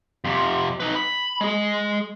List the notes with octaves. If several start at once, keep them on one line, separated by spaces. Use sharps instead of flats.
F2 C3
D#4 B4
B5
G#3 G#4